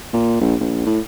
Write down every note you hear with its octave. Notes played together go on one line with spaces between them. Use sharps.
A#2
A#1
A#1
A2